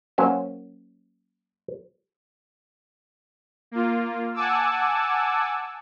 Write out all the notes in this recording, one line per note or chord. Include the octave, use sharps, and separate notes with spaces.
F#3 A#3 C#4 C5
A#3 F4
F#5 G#5 A5 D6 E6